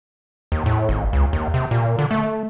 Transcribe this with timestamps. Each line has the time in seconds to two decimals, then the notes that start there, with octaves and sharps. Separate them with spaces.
0.52 D#2
0.66 A2
0.89 G#1
1.13 C#2
1.33 D#2
1.54 C3
1.71 A#2
1.99 D3
2.11 A3